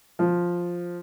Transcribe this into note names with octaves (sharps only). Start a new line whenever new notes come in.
F3